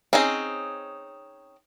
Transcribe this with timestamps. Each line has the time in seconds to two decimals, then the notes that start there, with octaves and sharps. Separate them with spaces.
0.13 C4 C#4 D#4 G#4